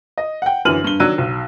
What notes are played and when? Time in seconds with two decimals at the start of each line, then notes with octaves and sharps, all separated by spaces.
0.18 D#5
0.42 F#5 G5
0.65 F#2 D3 E3 F6 D#7 F#7
0.84 G2 G7
1.00 D#3 F#3 D4 E6 F#6 D#7
1.18 B1